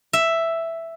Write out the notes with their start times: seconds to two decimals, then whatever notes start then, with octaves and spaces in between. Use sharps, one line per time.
0.13 E5